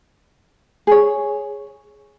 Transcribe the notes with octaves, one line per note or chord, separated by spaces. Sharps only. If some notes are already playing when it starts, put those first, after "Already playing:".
G#4 C#5